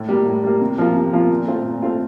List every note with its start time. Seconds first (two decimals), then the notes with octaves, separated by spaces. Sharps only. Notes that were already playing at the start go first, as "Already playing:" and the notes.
Already playing: A2
0.09 G3 A#3
0.26 A2
0.44 G3 A#3
0.61 C3
0.78 F3 A#3 F4
0.96 C3
1.13 F3 A#3 F4
1.30 A#2
1.47 A3 C4 F4
1.65 A#2
1.82 A3 C4 F4